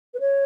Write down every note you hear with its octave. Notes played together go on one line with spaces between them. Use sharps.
B4
C#5